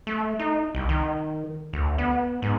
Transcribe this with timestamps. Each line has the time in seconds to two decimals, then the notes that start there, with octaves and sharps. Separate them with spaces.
0.07 A3
0.39 D#4
0.75 C2
0.89 D#3
1.73 D2
1.98 B3
2.42 G#2